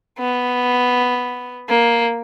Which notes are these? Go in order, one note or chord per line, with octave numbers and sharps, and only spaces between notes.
B3
A#3